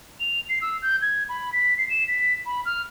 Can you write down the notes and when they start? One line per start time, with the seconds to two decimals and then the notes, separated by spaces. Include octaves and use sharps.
0.20 F7
0.49 C7
0.61 E6
0.82 G6
1.02 G#6
1.29 B5
1.53 B6
1.78 C7
1.90 E7
2.08 B6
2.46 B5
2.65 F6